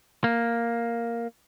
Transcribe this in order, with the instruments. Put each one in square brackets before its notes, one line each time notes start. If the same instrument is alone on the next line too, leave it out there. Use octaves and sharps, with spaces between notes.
[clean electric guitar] A#3